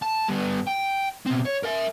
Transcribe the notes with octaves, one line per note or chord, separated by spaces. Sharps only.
A5
G2 B3
G5
B2 C4
C#5
A#4 E5